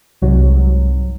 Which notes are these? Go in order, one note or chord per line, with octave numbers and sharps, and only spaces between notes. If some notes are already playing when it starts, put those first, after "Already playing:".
C2 G#2 C3 F#3